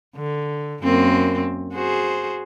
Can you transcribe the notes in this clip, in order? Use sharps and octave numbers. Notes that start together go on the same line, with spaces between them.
D3
F#2 A#3 C4
F#4 G#4 C5